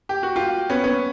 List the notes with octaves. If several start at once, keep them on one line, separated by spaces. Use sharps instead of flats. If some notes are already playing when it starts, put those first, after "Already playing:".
G4
F#4
F4 G4
B3 C#4
B3 C#4